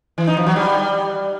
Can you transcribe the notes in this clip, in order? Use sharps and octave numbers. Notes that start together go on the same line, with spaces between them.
E3
D#4
F3
F#3
G3